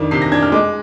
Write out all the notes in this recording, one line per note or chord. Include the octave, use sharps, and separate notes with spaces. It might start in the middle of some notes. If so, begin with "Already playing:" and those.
Already playing: F2 D#3 D4
C3 C7
A#6
D4 G#6
F6
G#3 D6